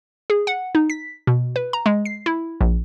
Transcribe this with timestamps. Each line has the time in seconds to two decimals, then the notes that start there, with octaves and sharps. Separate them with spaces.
0.30 G#4
0.47 F#5
0.75 D#4
0.90 B6
1.27 B2
1.56 B4
1.73 A#5
1.86 G#3
2.05 C7
2.26 E4
2.61 A#1